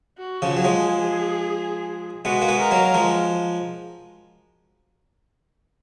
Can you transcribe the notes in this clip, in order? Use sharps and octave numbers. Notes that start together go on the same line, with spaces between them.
F#4
C#3 F3
F#3 G#4
F3 G#3
G#3 B3 F#4
A#3
G#3 B3
A#4
F#3 A#3
F3 G#3